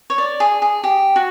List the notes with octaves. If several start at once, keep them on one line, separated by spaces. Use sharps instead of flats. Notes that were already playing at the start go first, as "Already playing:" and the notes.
C#5
D5
G#4
G#4
G4
F#4